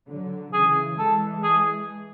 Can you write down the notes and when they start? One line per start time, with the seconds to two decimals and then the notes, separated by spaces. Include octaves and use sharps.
0.09 D3 F#3
0.53 C#3 E3 G#4
0.98 E3 G#3 A4
1.43 G#4